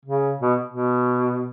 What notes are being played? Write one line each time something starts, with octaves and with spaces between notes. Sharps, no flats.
C#3
B2
B2